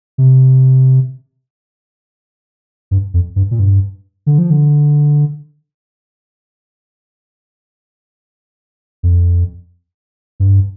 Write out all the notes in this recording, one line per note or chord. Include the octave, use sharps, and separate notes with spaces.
C3
G2
F2
G2
A#2
G2
D3
F3
D3
F2
G2